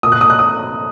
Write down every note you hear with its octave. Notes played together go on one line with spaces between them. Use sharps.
A#2 D#6
F#6
D#6
F#6
D#6